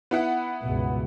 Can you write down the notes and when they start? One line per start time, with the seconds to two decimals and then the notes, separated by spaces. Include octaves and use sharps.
0.11 B3 E4 F#5
0.63 C#2 G2 B2